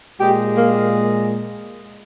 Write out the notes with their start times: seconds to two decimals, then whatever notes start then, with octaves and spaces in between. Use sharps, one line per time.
0.20 A#2 G#3 G4
0.57 A#3